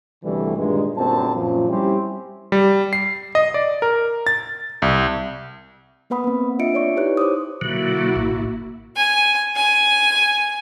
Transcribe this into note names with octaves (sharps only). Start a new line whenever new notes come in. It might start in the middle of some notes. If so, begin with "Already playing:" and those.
C2 B2 D3 E3 G3 A3
G2 A#2 D#3 G#3
G1 F#2 A#2 C4 A5
F#2 A#2 F3
G3 C4 C#4 E4 G4
G3
C7
D#5
D5
A#4
A6
C2
A#3 B3 B4 F#5 B5 D#6
A#3 C4
D4 F4 D#5 E5 C#7 D7
C#5 D5 C#6
D#4 E4 G4 B4 C#5 F#6
C5 D6 D#6
B2 D3 F#3 A#3 E4 F#4
A1 A2
G#5
G#5